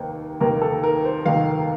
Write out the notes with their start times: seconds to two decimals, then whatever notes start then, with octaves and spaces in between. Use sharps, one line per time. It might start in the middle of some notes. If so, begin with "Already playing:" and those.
Already playing: F1 D#2 D#3 A#3 C5
0.40 F1 D#2 D#3 A#3 A#4
0.61 A4
0.84 A#4
1.05 C5
1.25 F1 D#2 D#3 A#3 F5